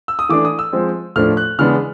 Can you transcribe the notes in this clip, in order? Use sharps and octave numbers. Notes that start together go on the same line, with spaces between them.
E6
D#6
E3 A3 D4 D6
D#6
E6
F3 G#3 C4
A2 F3 A3 D4 F6
F#6
C#3 E3 G#3 B3 D4 F6